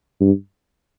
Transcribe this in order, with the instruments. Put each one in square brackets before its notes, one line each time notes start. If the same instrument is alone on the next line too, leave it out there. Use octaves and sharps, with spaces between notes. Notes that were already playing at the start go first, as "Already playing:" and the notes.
[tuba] G2